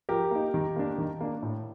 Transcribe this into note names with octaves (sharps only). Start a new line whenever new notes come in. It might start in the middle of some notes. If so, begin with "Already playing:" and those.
F3 G4 A#4
A#3 D#4
D#3
A#3 D4
D#3
A#3 D4
A2